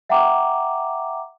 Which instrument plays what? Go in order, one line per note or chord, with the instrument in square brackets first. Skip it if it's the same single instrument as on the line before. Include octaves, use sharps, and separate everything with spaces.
[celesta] E5 F#5 G5 A#5 D6